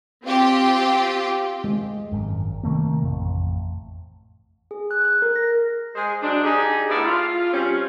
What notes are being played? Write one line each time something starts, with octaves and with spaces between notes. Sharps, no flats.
C4 F4 G4
G#3
G#1 F#2
C3 D#3 A3 A#3
A1 F2
G#4
F#6
F#6
A#4
A#6
G#3 C5
F#3 G#3 D4
D#4 G4 G#4
A2 B3 D5 E5 F5
F4
G3 C4 C#4